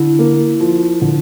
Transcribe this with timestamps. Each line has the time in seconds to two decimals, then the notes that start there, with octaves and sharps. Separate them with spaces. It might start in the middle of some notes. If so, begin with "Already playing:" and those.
Already playing: D3 E4
0.19 A#3
0.60 F3
1.02 D3